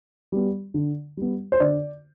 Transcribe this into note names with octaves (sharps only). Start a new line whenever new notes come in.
G3 B3
D3
G3 B3
C5
D3 D5